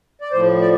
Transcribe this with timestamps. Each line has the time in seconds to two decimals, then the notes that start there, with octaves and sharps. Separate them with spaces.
0.21 D5
0.32 A2 F3 C5
0.61 D5